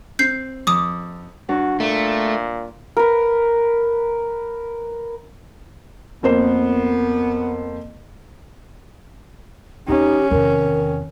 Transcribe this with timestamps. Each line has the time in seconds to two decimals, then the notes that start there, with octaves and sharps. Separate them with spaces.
0.19 C4 G6 C7
0.67 F2 D6 D#6
1.49 G2 F#4
1.80 A#2 A3
2.97 A#4 B4
6.23 F2 A#3 B3 C5
9.88 D#2 C#4 D#4 G4
10.31 E2 C3 D#3 A#4